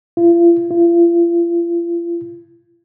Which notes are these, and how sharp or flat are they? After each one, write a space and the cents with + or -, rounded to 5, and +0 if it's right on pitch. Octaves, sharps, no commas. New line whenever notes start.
F4 -40
F4 -40